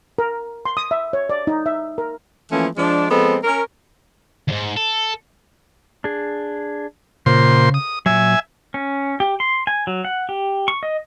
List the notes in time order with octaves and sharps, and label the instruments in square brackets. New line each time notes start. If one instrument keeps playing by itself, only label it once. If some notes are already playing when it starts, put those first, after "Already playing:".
[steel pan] A#4
C6
D#6
E5
C#5
D5
D#4
E5
A#4
[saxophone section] E3 F3 A3 A#3 C#4
F3 G#3 D4
F3 G#3 B3 C4 A4
C#4 A#4
[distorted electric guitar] D#2 G#2
A4
[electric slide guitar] D4 G#4
[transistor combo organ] A#2 C5 C6 [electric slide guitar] C#3
[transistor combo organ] D#6
[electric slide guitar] A#2 F#3 [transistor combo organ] E5 G#5
[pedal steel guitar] C#4
G4
C6
G#5
F#3
F#5
G4
C#6
D#5